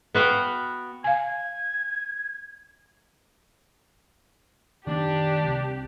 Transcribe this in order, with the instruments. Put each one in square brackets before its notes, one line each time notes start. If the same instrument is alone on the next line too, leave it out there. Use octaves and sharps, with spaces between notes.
[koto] B3 F#4 F5 G5
[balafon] F5 G#5 [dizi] G#6
[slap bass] D#3 A3 B3 [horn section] D4 [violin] G4
[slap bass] C2 C3